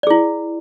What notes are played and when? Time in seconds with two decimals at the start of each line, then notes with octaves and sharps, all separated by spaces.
0.03 D5
0.07 G#4
0.10 E4